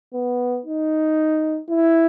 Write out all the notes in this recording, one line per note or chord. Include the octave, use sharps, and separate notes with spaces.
B3
D#4
E4